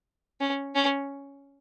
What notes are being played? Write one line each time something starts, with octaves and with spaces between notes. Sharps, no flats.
C#4
C#4